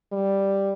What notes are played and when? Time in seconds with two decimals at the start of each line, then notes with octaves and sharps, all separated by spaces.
0.12 G3